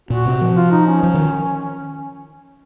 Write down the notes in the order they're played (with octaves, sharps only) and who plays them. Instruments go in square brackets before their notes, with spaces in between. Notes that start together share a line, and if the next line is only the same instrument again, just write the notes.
[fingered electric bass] A#2 [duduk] F#4
[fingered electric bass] C3
F3
[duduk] F4
D#4
C#4
[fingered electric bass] F3
D#3